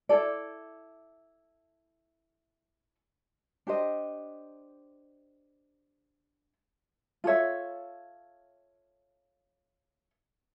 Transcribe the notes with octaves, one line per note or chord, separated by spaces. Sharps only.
E4 A4 D5
D4 G4 C5 D#5
F4 A4 C#5 E5